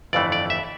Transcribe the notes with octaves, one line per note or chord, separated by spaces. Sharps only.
G1 F2 E3 A3 D5
D5
E5